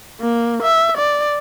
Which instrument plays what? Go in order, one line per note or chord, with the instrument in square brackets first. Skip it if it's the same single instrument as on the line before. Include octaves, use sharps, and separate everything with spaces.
[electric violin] A#3
E5
D5